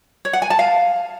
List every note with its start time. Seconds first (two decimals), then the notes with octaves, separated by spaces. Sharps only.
0.25 C#5
0.33 F#5
0.42 G#5
0.50 A5
0.59 F5